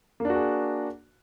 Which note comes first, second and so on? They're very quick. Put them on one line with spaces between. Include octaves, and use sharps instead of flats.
A#3 D4 F#4 G#4